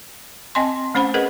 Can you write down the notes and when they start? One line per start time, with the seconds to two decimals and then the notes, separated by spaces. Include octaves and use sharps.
0.55 C4 D#5 G5 G#5 C6
0.95 A3 C#4 C5 F#5 B5
1.14 G#4 A#4 B4 C#5 D#5 F#5